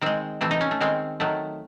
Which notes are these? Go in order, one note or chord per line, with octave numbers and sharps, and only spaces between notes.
D#3 G#3 C4
C3 E3 A3 C4
D#4
C#4
A3
D#3 G#3 C4
D#3 F#3 A3